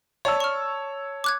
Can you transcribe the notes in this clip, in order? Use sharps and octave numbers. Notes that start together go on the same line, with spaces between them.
C#5 D5 A5 E6
C#6 F6
D6 F#6 G#6